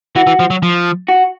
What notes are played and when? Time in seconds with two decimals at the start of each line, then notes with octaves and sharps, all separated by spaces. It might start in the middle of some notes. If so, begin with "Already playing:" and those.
0.16 E3 F#4
0.27 E3
0.40 F3
0.50 F#3
0.63 F3
1.08 F#4